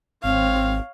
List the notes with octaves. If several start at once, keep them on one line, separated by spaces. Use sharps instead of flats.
G#1 C4 C#5 F5